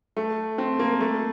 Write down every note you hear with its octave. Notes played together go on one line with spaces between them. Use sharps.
A3
C4
A#3
A3